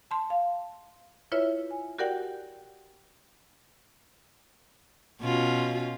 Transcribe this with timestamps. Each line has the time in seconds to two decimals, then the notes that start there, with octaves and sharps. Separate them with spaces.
0.11 A5 C6
0.30 F5
1.32 E4 F4 B4 C#5 E5
1.71 G#5
1.98 F#4 G4 A#4 D5 F#5 G5
5.21 B2 C#4 F4